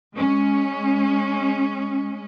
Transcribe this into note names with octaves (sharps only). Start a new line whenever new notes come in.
G#3 C#4